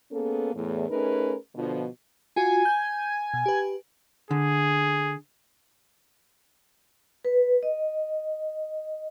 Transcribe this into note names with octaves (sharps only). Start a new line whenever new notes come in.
A#3 B3 C#4 G#4 A4
E2 A2
A3 C#4 D#4 G#4 A#4 B4
B2 D3 F3
F4 F#4 G#5
G6
B2
G4 B4
D3 G#4
B4
D#5